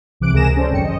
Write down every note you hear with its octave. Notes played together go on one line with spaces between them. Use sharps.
C2 C3 E3 D6 F#6 D7
C#2 C3 G#4 A#4 A#6 E7
C#4 A4 C5 D5
G#1 F#2 C#4 G5 C#7
D#5